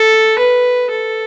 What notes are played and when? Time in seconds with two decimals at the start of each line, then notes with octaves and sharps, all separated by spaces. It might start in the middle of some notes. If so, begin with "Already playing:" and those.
Already playing: A4
0.39 B4
0.90 A4